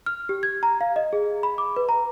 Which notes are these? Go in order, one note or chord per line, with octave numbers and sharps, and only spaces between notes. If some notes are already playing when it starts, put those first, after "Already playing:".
F6
G4
G#6
A#5
F5
D#5
G#4
B5
D6
B4
A#5